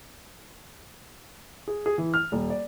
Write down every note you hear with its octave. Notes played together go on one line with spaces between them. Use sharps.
G#4
G#4
E3
F6
D#1
D5